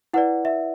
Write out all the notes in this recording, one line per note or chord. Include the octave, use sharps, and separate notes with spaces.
E4 B4 D5 F#5
E5